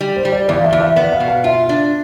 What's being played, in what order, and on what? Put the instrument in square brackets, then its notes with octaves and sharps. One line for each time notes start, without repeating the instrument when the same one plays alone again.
[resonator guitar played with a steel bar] G3
[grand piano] C5
[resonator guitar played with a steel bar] G3
[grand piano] D5
[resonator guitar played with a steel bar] E2 [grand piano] D5
[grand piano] F5
E5
[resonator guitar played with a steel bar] E2
[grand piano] E5
[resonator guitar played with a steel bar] B3 [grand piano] D5
[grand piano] F5
[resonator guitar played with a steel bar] B2
[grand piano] F5
[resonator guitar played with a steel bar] F4 [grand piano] E5
[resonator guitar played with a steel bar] D4